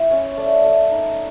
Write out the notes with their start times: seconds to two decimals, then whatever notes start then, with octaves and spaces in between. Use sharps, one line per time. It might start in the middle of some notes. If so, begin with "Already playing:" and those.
Already playing: E4
0.11 C#4 C#5
0.37 A3 D5
0.64 A3
0.91 D#4